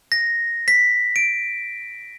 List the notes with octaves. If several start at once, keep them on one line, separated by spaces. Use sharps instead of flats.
A#6
B6
D7